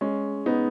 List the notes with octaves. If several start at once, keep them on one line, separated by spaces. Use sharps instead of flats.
G#3 C#4
B3 D#4